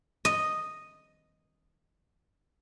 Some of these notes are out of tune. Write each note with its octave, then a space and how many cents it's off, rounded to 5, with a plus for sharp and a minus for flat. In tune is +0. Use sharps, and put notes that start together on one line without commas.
D#5 -5